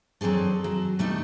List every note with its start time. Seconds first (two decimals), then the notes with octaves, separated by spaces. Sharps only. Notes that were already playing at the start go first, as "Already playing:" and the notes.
0.21 F#3 C4 D4 G#4 A4
0.64 F#3
0.99 B2 G3 A3 D4 D#4